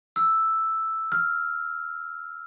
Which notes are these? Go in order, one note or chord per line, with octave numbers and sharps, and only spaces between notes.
E6
F6